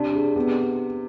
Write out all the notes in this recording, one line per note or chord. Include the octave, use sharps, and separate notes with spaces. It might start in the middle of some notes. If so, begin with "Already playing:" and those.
Already playing: C3 D4
G#4
C3 B3